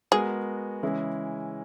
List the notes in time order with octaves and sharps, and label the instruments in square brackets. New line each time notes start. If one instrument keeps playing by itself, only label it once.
[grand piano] G#3 B3 F#4 A#4 [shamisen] G#4
[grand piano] C#3 E3 G#3 C#4 E4